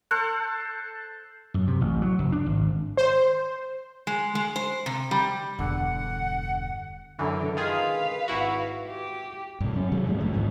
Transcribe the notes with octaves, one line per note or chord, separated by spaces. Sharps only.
A4 C5 F#6
F#2
C3
A1
F#3
F#1
D4
G#1
C5
G#3
G#3
C5
C3
G3
E1 E2 G2 D3 F#5
F#2 D3 E3
D#3 F4 G#4 B4 F5
G#1 E4 F#4
G4
G2 C3
F#3 C#4
C3 D#3 F#3 G#3
F#2 A2 F3 G3
G#1 D2 G#2
G#1 G#2 D3 F3